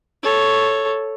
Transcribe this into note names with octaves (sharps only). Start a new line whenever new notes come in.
A4 C#5